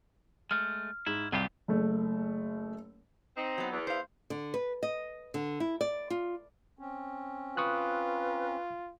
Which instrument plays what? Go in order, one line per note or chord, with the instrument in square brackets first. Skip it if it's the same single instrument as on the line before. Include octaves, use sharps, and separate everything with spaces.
[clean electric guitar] G#3 A3 [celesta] F6
[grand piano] G#2 [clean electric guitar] E4
[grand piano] C2 [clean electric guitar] F#3 F4 G4
[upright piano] F#1 A3
[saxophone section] C4 D#4
[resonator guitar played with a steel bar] F#3 B3
[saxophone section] E2
[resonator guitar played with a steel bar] C5 F5
[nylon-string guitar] D3
B4
D#5
D3
E4
D5
F4
[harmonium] C4 C#4
[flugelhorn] F4 [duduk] B4 [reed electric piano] C#6 D#6 F#6